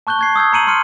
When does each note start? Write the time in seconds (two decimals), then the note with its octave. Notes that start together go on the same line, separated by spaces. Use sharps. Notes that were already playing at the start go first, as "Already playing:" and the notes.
0.07 A5 C#6 F#6 G6 G7
0.19 F#6 G#6 C7
0.36 D#6 E6 G6 G#6
0.53 A#5 C#7 D#7 F#7
0.67 A#5 C6 F6 C#7 D#7